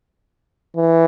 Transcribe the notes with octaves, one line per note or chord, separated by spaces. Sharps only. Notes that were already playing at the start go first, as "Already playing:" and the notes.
E3